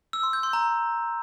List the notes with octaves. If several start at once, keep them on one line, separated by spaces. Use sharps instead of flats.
E6
C6
G6
C6
A#5